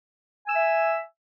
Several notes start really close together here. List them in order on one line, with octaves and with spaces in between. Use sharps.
G#5 E6 E5